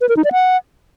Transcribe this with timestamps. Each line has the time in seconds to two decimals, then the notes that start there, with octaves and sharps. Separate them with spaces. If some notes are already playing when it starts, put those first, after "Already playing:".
0.01 B4
0.09 A#4
0.17 D#4
0.24 D5
0.32 F#5